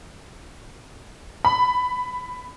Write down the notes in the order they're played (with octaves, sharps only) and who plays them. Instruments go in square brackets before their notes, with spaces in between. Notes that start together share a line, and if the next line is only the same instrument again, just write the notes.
[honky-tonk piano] B5